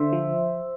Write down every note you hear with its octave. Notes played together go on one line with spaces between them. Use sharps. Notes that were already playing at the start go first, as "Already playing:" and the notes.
Already playing: D3 C5 E5
F3